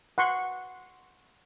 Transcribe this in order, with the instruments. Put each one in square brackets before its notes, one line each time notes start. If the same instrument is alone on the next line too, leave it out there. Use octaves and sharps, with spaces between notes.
[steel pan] F#5 C6 C#6